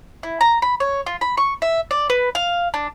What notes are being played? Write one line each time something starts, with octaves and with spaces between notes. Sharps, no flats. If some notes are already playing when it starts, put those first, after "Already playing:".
E4
A#5
B5
C#5
F4
B5
C#6
E5
D5
B4
F5
D4